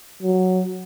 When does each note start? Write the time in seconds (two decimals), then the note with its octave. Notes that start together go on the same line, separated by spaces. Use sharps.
0.22 F#3